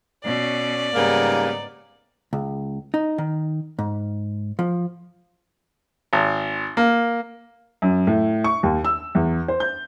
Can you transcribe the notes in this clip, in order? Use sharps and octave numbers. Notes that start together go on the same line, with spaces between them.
B2 C#4 D5
G#2 C#3 G3 A#3 B3 D#4
C#2
D#4
D#3
G#2
F3
G#1
A#3
F#2
A2
C#6
D#2
E6
E2
C5
G6